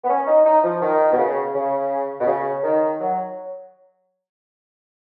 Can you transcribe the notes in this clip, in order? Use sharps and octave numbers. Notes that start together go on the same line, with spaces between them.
B3
C#4
D#4
D#4
F3
D#3
B2
C#3
C#3
B2
C#3
D#3
F#3